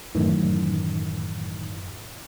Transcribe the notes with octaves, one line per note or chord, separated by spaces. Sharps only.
F#2 A2 D#3 E3